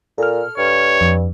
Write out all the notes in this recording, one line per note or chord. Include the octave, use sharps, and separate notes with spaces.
A#2 A4 F6
G2 C#5
F2